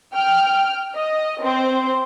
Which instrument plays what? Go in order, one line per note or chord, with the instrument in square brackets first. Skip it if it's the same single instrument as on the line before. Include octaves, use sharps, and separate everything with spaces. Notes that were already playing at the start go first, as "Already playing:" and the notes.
[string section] G5 F6
D#5
C4 C5